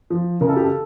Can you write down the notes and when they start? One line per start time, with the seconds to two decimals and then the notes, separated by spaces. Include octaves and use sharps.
0.10 F3
0.41 C#3 A#4
0.49 A4
0.56 G4
0.64 A4